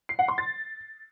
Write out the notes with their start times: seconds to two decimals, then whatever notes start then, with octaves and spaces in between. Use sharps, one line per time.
0.09 C7
0.19 F#5
0.28 C6
0.38 A6